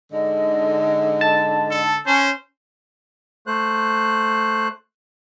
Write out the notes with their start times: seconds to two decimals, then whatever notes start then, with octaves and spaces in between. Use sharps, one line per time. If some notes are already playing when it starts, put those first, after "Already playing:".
0.13 G#2 D3 D#5
1.21 A5
1.71 A4
2.06 C#4 C5
3.47 A3 C5 F#6